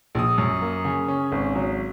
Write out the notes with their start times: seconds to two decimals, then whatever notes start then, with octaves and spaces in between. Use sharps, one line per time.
0.15 A#1 D#6
0.38 F#2
0.62 A#3
0.85 C#3
1.08 C#4
1.32 G#1
1.55 F#3